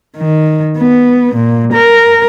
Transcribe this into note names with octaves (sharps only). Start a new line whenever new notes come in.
D#3
B3
A#2
A#4